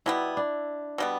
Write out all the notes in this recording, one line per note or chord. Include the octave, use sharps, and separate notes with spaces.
B2 G3 B3 E4
D4
B2 G3 B3